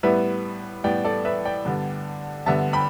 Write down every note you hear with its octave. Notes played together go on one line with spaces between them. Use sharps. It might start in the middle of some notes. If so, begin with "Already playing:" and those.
A2 G3 B3 B4 E5
A2 G3 B3 D5 G5
A4 D5
B4 E5
D5 G5
G2 D3 B3
G2 D3 B3 E5 A5
G5 B5